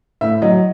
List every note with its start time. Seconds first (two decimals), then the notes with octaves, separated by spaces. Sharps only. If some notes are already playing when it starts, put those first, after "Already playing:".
0.21 A2 E5
0.42 F#3 D#5